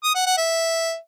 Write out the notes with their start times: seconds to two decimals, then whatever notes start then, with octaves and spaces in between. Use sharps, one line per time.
0.04 D#6
0.15 F#5
0.26 F#5
0.37 E5